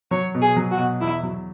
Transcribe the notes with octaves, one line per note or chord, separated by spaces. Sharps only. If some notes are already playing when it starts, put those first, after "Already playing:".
F#3 C#5
B2
G#4
F#3
F#4
B2
E2 E4
F#3